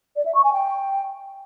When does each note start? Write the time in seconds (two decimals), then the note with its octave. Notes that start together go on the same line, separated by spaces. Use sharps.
0.16 D5
0.25 E5
0.35 C#6
0.44 G#5
0.53 G5